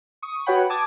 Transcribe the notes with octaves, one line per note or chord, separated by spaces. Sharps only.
C#6 D#6
F#4 B4 C#5 F#5 G5 B5
A5 D6 D#6 G#6